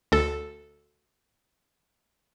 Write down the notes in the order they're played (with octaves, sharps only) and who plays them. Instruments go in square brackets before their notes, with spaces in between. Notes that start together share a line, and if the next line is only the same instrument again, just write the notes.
[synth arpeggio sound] D2 A4